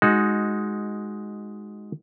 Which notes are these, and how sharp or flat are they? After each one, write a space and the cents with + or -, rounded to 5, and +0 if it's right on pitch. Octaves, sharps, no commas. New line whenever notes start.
G#3 +5 D#4 +0 F#4 +0